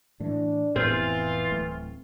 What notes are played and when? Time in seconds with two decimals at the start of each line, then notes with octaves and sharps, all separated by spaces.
0.20 A2 E3 D4
0.76 F1 A2 E3 B3 C4 F4
1.51 D1 A3